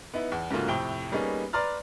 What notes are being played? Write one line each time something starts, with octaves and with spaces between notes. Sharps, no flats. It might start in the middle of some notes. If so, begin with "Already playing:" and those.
B3 D#4 E4
E2
G#2 C#3 A3 A#3 F4 F#4
F2 A2 C3 G5 G7
G3 A#3 B3 C#4 D#4 G#4
B4 D5 A#5 C6 F6 A6